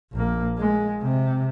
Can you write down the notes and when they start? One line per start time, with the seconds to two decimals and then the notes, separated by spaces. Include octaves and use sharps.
0.12 A#1 A#3
0.58 G#3
1.02 C3